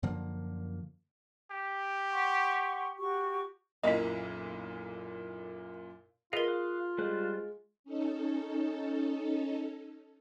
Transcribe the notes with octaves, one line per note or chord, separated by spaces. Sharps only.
F#2 D3 F3 A#3
G4
F#5 C6 C#6
F#4 G4 C#6
B1 F#2 A#2 A#3 E4 D#5 B6
F4 G#4 A#4 B4 D#5 F5
F5 D#6 F#6
G3 G#3 C5 F#6
C#4 D#4 A4